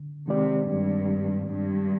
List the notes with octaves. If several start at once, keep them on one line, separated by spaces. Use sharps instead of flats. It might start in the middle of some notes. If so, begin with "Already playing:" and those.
Already playing: D3
C3 D#3 G#3 C4 G4 D5
G2
G2